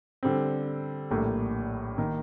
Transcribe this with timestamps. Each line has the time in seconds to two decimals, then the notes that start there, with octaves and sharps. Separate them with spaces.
0.23 D3 G3 C4
1.11 A#1 A2 G3 A#3
1.98 D#3 A#3